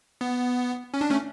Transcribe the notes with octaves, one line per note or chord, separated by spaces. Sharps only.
B3
C#4
D4
A3 C#4